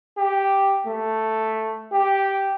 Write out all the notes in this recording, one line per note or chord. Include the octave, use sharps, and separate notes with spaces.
G4
A3
G4